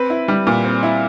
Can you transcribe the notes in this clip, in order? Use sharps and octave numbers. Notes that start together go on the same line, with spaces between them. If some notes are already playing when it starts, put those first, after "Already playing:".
Already playing: C4 B4
E4
G3
A#2
C4
E4